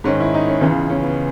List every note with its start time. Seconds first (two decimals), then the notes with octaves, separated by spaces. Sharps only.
0.04 G#2 D#3 C#4
0.20 E4
0.34 D#4
0.48 C#4
0.61 C#2 C#3 E3 B3
0.90 C#4
1.03 B3